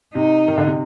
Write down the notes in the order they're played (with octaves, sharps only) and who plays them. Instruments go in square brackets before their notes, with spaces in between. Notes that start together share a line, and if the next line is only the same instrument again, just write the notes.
[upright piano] C3 [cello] D#4
[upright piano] D#3
D3
C3